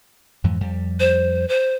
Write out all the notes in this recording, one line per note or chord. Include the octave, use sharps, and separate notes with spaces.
F2 G#2 E3
F2 G3
C5
C5